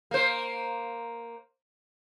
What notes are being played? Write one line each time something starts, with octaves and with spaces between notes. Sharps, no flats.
A#3 C5